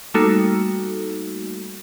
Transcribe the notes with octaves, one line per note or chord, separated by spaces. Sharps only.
G3 A3 A#3 D#4 F#4 A4